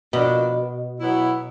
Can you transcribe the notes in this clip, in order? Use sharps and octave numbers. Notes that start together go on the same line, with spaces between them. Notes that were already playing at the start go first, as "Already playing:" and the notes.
B2 F3 A#3 D4
F#3 B3 E4